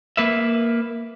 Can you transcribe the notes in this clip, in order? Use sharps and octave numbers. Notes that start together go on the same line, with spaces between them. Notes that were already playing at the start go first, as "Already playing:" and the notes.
A#3 B4 E5